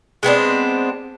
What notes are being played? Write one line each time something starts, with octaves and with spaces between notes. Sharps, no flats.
G#3 B3 C4 D4